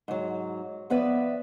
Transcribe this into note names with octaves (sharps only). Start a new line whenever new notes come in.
G#2 F#3
F3 B3 B4 D5 E5